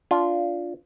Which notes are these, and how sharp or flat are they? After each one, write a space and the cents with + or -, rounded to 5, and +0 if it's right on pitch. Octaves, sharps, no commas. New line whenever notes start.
D4 -20 F4 -5